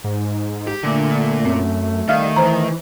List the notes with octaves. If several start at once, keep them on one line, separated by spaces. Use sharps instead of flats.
G#2
G4
A#2 D3 A3
F#2 C4
D#3 G3 E5 F5 F6
E3 C5 A#5